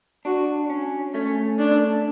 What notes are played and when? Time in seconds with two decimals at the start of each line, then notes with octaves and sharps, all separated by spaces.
0.25 D4 F#4
0.70 C#4
1.14 A3 C#4
1.59 D4